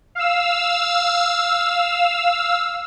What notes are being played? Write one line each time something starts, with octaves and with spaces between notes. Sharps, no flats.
F5 E6